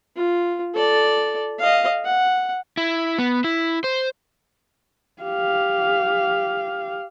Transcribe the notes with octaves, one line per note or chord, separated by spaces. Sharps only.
F4
A4 D5
D#5 F5
F#5
E4
B3
E4
C5
G4 F5